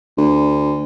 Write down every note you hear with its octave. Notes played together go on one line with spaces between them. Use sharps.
D2